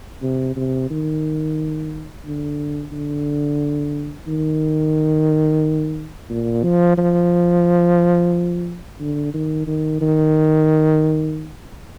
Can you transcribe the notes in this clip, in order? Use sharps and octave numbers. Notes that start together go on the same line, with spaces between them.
C3
C3
D#3
D3
D3
D#3
A#2
F3
F3
D3
D#3
D#3
D#3